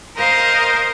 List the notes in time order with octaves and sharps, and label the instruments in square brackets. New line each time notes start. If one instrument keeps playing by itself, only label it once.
[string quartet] A#4 C5 D#5 F5